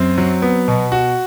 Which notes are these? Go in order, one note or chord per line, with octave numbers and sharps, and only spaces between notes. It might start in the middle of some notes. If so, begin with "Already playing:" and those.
Already playing: F#2 C4
F#3
B3
B2
F#4